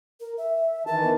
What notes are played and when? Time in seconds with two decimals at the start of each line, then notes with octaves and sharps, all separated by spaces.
0.20 A#4
0.37 E5
0.87 D#3 E3 A#4 A5
1.03 B3